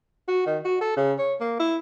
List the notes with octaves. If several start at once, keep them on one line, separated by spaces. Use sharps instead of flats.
F#4
D#3
F#4
A4
C#3
C#5
A#3
E4